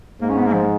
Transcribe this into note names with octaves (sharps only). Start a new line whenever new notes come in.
G#2 A#3
C#4
B3
A#3
F3